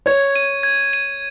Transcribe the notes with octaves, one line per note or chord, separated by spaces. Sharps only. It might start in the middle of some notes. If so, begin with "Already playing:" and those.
C#5 G#6
D#7
G#6
D#7